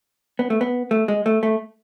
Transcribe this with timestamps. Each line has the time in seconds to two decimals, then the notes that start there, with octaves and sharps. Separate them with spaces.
0.39 B3
0.50 A3
0.61 B3
0.91 A3
1.08 G#3
1.26 A3
1.43 A3